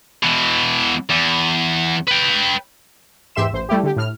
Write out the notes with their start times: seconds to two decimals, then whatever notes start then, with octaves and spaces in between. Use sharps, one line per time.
0.23 B2 E3
1.10 E2
2.08 B4 G5
3.35 E2 G#2 G4 E5 C6 E7
3.53 A1 C5
3.69 G3 A3 E4 G4
3.83 D3 G4
3.96 A2 F6